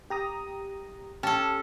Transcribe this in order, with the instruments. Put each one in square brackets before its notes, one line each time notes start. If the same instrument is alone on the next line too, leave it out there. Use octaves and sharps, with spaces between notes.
[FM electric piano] G4 A#5 D#6
[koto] C#4 A4 [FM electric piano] G4 A5